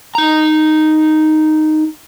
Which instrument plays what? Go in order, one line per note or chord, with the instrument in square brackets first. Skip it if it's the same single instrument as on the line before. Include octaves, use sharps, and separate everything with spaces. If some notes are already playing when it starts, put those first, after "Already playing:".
[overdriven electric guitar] D#4 A#5